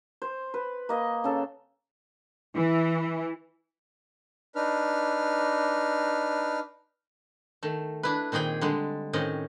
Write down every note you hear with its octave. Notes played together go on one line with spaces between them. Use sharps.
C5
B4
A#3 D#5
C#3 A4
E3
D4 D#4 B4 F6
D#3 A3
D4 E4 B4
A#2 D#3 C4 G#4 G5
D3 G3 G#3
A2 D#3 C4 C#4 D#5